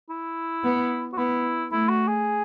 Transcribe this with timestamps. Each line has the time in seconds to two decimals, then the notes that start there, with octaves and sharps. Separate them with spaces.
0.10 E4
0.64 B3
1.13 F#4
1.18 B3 E4
1.71 A3 E4
1.89 F#4
2.07 G#4